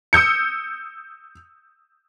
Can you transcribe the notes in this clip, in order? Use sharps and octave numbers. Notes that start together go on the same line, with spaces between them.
D#6 E6 G6 C#7